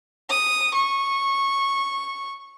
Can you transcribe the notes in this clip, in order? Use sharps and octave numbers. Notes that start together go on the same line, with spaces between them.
D#6
C#6